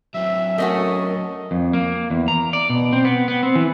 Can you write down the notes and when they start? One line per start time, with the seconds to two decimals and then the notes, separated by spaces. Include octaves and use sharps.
0.14 F#3 C4 E5
0.58 A3 C#4 F#4 A#4 D#5
1.51 F2
1.73 A#3
2.10 E2
2.28 A#5
2.53 D5
2.70 B2
2.93 C4
3.05 B3
3.28 B3
3.43 C4
3.55 E3